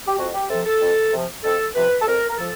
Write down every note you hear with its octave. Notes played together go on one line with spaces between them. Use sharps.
G4
F2 F#4
G4
C3 F3 A4
A4
F2
C3 F3
F2 A4
C3 F3 B4
A4
F2 A#4
A#4
F3 A4